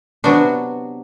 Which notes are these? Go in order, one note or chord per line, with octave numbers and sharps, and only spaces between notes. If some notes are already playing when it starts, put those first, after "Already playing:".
C3 F#3 B3 D4 F#4